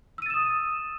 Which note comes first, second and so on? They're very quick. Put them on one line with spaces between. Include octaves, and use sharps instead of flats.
E6 D#7 A6 E7 D#6